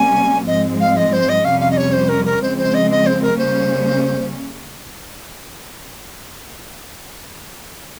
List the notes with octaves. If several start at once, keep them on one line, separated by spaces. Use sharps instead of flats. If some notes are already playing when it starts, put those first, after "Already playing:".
Already playing: C3 G3 A#3 C#4 G#5
G#2 F3 G#3 C4 D#5
F5
D#5
C5
D#5
F2 C3 G3 C#4 F5
F5
D#5
C#5
C5
A#4
A#4
C#3 F3 G#3 C4 C5
C5
D#5
D#5
C5
A#4
C#3 G3 A#3 C#4 C5